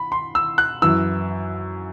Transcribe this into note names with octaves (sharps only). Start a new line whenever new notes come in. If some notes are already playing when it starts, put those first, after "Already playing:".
Already playing: B5
C6
E6
F#6
F#2 E3 E6